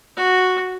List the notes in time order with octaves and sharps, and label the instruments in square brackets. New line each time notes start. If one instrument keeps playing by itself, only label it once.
[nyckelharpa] F#4